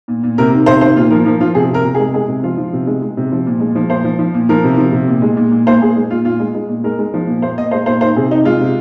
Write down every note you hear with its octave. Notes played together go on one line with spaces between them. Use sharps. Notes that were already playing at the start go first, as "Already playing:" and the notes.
A#2
A#2
C3 A#4
D#3
C3 C5
D#3 C5
A#2 F4
F3 A#4
F3 A#4
F3 F4
C3 G#4
C3 A#4
C3
G#4
G#3
G#3 G#4
C3
F3 F4
F3
C3
G#3
G#3
C3
F3
A#2
G#3
F3
A#2 C5
F3
F3
A#2
F3 A#4
C3
F3
C3
A#2
G#3
A#2
A#2
A#2 C5
A#2 G#4
G#3
A#2 F4
A#2 F4
G#3
G#3
A#2
G#3 A#4
G#3
F3
A#2
A#2 C5
A#2 D#5
G#3 C5
A#2 C5
D#3 C5
C3 G#4
C3 D#4
G#3 F4
C3